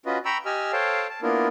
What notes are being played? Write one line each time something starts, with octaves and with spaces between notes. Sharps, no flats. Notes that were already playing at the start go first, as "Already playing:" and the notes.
C#4 F4 F#4 B4 D#5
G5 A#5 B5 C#6 E6
G4 D#5 G#5 E6 F6
A4 C5 C#5 F5 G5 A5
A5
A#3 B3 D4 E4 F4 A#4